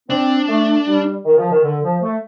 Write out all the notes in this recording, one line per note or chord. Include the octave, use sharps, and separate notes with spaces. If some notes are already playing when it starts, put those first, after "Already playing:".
C4 D4
A3
G3
D#3
F3
D#3
D3
F3
A3